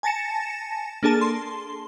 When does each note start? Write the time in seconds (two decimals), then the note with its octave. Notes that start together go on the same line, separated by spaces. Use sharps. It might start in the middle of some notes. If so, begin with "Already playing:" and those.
0.03 G#5 A5 A6 A#6 C#7 E7
1.03 A#3 D4 G#4 A4 A5
1.21 C6